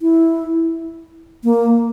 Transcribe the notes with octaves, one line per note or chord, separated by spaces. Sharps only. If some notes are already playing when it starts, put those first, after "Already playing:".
E4
A#3